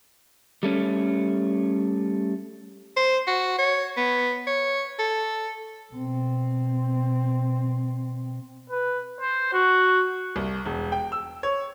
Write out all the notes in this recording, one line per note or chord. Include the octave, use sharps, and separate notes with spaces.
G3 A3 C#4
C5
F#4
C#5
B3
C#5
A4
B2 C4
B4
C5
F#4
C2
E1
G5
E6
C#5